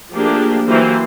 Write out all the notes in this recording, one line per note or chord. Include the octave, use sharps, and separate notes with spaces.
F3 A3 A#3 D4 G4 G#4
E3 F#3 A#3 G4 C5